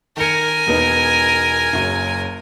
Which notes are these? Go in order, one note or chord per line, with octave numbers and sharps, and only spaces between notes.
D#3 A#4 G#5 C#7
E1 B3 D#4
F#1 F#2